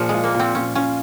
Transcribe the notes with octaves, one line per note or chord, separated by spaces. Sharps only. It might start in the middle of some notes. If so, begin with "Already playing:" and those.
Already playing: A#2 F3 G#4
G#3 F4
A#3
A#2 C4
A#2 C#4
C#4 F4